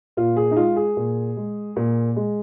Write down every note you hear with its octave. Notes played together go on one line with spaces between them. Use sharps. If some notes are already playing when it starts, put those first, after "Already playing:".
A#2 F4
G#4
D#4
G#3 F4
G#4
A#2
G#3
A#2
G#3